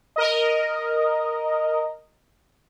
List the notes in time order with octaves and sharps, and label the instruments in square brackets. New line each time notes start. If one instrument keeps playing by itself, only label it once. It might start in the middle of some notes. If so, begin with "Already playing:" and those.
[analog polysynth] A#4 D#5